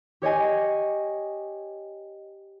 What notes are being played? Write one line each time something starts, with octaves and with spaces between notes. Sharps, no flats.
G4 C#5 D#5 G#5